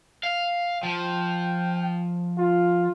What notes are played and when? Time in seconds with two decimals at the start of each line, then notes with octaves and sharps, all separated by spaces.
0.23 F5
0.83 F3 G5
2.38 F4